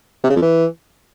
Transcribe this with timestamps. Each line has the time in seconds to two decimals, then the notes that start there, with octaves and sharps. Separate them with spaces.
0.23 C3
0.30 C#3
0.36 F2
0.42 E3